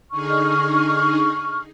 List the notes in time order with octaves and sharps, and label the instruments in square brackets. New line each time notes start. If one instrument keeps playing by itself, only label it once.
[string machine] D3 D#4 G#4 [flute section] C#6 F6